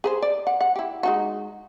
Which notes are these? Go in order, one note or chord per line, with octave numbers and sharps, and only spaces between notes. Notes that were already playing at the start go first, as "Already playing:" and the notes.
G#4 B4 C5
D5
F#5
F#5
E4 G4
G#3 D#4 F#4